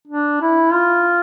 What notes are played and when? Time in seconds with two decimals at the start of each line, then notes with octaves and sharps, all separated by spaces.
0.07 D4
0.41 E4
0.73 F4